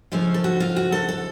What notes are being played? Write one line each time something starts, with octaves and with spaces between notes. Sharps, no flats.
D#2 C#3 F3 A3 F5
A4
F#4
F4
F#4
A4
A4